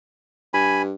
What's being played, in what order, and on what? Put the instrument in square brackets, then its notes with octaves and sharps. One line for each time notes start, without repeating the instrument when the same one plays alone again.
[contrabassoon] G2 [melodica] G#5 B5